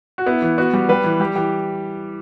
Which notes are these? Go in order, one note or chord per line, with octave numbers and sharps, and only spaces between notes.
F#4
B3 E4
E3
B3 F#4
G3 G4
G3 B4
E3
G3 G4
E3 G4